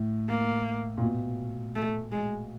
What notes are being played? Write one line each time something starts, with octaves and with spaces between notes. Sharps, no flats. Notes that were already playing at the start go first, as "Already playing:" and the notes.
Already playing: A2
A#3
A#2
B2
A3
G#3